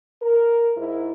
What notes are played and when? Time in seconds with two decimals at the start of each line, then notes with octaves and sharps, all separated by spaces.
0.22 A#4
0.77 G#2 E4